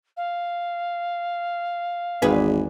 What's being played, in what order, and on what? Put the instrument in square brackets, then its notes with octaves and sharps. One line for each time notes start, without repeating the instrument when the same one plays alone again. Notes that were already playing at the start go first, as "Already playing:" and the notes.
[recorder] F5
[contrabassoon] G#1 [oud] E2 G#4 B4